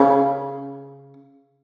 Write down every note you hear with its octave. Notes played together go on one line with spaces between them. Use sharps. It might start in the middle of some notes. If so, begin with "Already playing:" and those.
Already playing: C#3